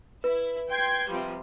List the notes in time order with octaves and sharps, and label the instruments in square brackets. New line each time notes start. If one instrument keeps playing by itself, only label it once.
[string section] E4 [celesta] B4
[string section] G5 C6 G#6
C3 F3 G3